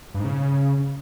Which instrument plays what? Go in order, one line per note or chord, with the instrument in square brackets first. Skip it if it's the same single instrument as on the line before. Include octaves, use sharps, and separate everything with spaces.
[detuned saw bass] G2
G#2
C#3